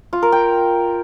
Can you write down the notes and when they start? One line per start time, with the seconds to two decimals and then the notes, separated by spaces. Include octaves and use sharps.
0.13 F4
0.22 A#4
0.32 G5